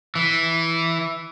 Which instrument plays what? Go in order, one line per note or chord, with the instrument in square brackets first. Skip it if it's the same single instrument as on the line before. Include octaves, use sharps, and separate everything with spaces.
[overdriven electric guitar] E3